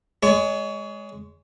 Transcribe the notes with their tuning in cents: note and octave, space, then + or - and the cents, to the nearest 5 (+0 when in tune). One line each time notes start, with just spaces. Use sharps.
G#3 +0 C#5 +30